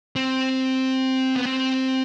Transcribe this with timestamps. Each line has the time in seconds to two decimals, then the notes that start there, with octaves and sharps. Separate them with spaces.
0.16 C4
1.36 B3
1.45 C4